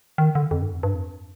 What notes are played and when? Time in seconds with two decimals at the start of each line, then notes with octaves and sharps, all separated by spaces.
0.18 D#3
0.35 D3
0.51 F2
0.62 G2
0.73 F2
0.83 G2
0.95 F2